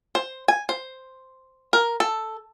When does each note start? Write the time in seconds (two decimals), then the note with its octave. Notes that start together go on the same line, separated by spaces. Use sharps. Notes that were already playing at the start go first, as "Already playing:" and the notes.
0.15 C5
0.48 G#5
0.69 C5
1.73 A#4
2.00 A4